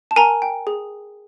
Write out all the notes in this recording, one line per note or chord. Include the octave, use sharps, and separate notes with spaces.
A5
A#4 G#5 A#5
G5
G#4